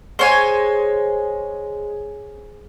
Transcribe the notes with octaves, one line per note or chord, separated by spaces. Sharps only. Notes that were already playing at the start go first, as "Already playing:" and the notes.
G#3 C5 C#5 G#5